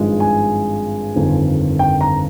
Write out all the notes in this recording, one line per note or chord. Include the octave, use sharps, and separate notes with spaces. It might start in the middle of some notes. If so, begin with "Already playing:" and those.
Already playing: G#1 G2 F3 G#3
G#5
G1 F2 D#3
G5
A#5